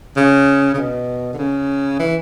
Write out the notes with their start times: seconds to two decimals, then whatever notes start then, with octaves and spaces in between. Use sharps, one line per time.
0.16 C#3
0.74 C#3
0.77 B2
1.33 D3
1.38 C#3
1.99 E3